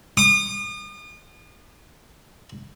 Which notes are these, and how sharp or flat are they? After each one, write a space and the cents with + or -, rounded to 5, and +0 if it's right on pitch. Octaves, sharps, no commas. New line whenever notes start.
D#6 -40